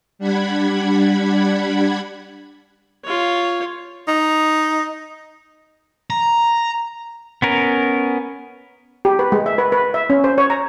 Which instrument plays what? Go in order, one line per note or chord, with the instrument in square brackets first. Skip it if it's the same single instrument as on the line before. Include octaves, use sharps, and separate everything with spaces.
[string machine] G3 D4 F#5 B5 G#6
[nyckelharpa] F4 C#5
[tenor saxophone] D#4
[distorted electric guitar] A#5
[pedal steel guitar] B3 C#4 A#4
[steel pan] G4
B4
G#3
E5
B4
B4
E5
C#4
C5
C#5
A#5